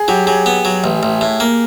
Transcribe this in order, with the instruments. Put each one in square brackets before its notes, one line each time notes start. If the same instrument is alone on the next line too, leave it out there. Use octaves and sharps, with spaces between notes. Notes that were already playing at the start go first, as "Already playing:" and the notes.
Already playing: [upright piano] G#4
[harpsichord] F#3 [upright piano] G4
[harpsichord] F#3 [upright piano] G#4
[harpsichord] B3
F#3
A1
A1
A2
A#3